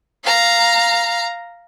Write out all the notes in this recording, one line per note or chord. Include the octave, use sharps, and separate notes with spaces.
F5 A#5